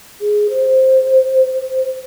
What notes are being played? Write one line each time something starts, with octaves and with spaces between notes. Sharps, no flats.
G#4
C5